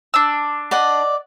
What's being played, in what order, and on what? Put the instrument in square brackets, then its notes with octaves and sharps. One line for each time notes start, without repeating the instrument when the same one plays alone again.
[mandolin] D4 E6
[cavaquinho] D5 D#5 F#5